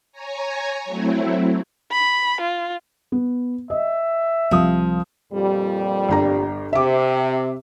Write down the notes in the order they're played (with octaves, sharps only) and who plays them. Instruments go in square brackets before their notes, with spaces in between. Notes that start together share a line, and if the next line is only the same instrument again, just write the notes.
[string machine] C#5 G#5 A#5
F#3 A3 C4 E4
[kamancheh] B5
F4
[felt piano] B3
[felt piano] D#5 [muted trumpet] E5
[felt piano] C2 F5 D#6 [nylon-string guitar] F3
[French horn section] F2 A#2 G3
[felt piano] G1 G4 A#5
[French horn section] C3 [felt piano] E5 D6